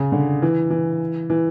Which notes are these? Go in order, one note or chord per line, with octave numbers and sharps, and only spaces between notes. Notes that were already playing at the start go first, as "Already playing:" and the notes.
Already playing: C#3
D3
E3
E3
E3